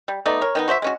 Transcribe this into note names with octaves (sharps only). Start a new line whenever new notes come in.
G3
A3 B3 D#4 D5
A#4 C#5
D#3 B3 D#4
F#4 C5 D5 E5
G#3 C#4 F#4